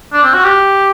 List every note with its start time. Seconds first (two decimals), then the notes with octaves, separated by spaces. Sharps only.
0.13 D4
0.23 C4
0.34 F#4
0.44 G4